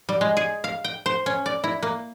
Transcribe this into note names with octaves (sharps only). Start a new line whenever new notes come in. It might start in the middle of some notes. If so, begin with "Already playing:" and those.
G3
G#3
G#4
F5
G5
C5
C#4
D5
E4
A#3